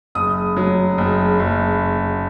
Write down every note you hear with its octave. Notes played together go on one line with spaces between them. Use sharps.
F#1 D#6
F#3
F#1
F#1